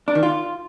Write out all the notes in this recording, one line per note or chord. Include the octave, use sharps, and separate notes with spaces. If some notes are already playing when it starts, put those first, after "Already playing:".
D4
D#3
F4